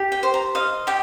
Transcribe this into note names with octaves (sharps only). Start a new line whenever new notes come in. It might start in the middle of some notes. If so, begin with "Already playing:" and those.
Already playing: G4
G5
C5
A#5
D#5 F5
G4 G5